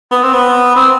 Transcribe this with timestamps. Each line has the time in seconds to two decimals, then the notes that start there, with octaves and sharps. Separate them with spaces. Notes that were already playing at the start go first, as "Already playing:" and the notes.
0.12 B3
0.23 C4
0.33 B3
0.76 C4